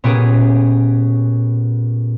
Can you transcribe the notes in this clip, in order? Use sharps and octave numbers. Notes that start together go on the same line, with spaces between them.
A#2 B3 C#4 G4 G#4